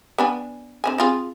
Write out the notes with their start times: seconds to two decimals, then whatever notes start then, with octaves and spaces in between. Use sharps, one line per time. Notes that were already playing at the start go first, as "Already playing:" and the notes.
0.18 B3 D4 G#5
0.84 D3 C4 G#5
0.98 C4 F4 G#4